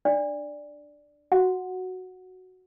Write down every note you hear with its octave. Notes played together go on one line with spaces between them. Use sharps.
D4 D5
F#4 F#5